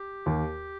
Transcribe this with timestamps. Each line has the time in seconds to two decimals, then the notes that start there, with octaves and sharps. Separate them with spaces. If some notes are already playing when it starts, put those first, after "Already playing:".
Already playing: G4
0.26 D#2